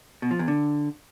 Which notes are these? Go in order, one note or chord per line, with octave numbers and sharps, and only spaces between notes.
B2
F3
E2
D3